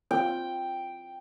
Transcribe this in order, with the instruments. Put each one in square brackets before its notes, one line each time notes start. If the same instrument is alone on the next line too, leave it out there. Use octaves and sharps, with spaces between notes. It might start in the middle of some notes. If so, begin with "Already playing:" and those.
[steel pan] C4 F4 [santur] G5